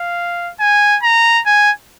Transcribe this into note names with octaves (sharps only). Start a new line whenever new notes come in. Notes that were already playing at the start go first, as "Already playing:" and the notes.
Already playing: F5
G#5
A#5
G#5